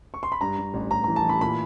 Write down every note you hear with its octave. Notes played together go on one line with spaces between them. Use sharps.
C#6
C6
B5
G2 A#5
G2
A1
A1 A#5
E3 A#5
A5
E3
B5
A#2 B5